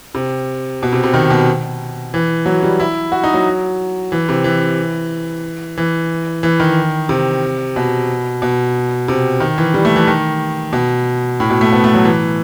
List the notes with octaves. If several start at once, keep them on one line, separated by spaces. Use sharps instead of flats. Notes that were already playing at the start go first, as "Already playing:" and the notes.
C3
B2
C3
C3
D#3
B2
E3
F#3
G3
E4
F#4
D#4
F#3
E3
C3
E3
E3
E3
D#3
C3
B2
B2
C3
D#3
E3
G3
A3
E3
D#3
B2
A2
B2
A3
B3
A3
F#3
E3